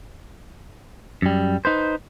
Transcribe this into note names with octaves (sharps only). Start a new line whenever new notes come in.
F#2 G3
D#4 B4 C5